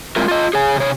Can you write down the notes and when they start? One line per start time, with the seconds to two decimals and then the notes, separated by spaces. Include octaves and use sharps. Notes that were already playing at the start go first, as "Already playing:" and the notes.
0.16 G#3 C4 E4 F4 A#4
0.28 F4 D#5
0.53 G#4 C#5 G#5
0.76 C3 C#5